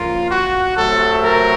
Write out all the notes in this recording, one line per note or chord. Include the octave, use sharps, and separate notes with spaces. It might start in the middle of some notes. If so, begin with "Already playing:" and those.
Already playing: C#3 F3 A#3 F4
F#4
C3 F#3 A3 C4 A4
A#4